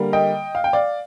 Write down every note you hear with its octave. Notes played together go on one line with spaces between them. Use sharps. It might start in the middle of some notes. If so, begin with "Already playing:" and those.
Already playing: D3 G3 A#3
D#5 G5
F5
G5
D5 F5